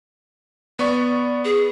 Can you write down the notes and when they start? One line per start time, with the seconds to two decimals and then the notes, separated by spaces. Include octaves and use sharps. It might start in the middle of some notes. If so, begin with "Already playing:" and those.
0.79 B3 D5 C#6
1.45 G#4